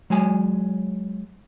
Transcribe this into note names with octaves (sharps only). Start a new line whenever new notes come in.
F#3 G#3 G#5